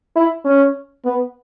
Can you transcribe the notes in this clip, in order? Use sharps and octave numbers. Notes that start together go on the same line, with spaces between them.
E4
C#4
B3